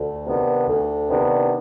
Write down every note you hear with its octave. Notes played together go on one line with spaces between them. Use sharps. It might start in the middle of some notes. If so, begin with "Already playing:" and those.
Already playing: D2
C3 D#3 B3 D4
D2
C3 D#3 B3 D4